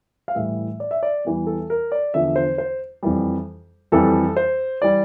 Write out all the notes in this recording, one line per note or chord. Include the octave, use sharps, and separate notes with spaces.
F5
A2 E3 G3 E5
D5
E5
D5
E2 E3 G3
A4
A#4
D5
E2 D3 F3 E5
C5
C5
F2 E3 G3
F2 E3 G3 A4
C5
E3 G3 D5